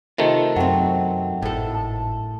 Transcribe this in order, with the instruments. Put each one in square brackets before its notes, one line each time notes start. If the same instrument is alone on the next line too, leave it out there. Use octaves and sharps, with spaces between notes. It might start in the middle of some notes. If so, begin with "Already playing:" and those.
[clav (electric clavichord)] C3 D#3 A3 [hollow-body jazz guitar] F4 G#4
[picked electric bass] F#2 [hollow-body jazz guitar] F#3 C4 [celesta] F#5 G5
[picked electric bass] G#1 [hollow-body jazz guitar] A2 A4
[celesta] A5